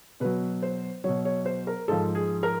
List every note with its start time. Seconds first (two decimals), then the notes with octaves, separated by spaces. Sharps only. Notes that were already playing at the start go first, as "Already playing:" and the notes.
0.20 B2 F#3 B4
0.63 C5
1.04 B2 F#3 C#5
1.25 C#5
1.46 C5
1.67 A#4
1.88 G#2 F3 A4
2.15 G#4
2.43 A#4